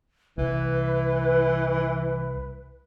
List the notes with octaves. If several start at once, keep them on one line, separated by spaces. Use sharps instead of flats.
C2 E3 B4